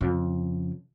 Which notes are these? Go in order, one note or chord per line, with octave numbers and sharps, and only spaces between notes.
F2 C#3